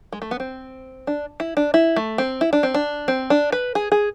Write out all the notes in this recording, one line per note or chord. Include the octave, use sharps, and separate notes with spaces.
G#3
A3
B3
C4
D4
E4
D4
E4
A3
C4
E4
D4
C4
D4
C4
D4
B4
G#4
G#4